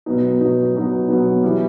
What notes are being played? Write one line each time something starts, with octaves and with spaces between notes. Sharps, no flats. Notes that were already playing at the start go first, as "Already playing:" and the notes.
B2 F#3 B3 D#4
B2 F#3 B3 D#4
B2 F#3 B3 D#4
B2 F#3 B3 D#4
E3 G3